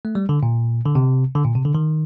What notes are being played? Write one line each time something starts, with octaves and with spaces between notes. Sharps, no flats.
A3
G3
D3
A#2
D3
C3
D3
A#2
C3
D3
D#3